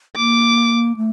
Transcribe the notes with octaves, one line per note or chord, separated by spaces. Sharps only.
A#3 D6
A3